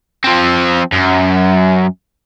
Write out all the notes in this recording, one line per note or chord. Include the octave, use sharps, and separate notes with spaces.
F3 C4
F#2